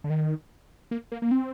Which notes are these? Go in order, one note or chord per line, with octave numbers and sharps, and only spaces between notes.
D3
D#3
A#3
A#3
A#3
C4